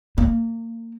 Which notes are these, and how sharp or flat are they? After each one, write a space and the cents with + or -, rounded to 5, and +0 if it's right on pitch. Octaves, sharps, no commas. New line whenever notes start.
A#3 -30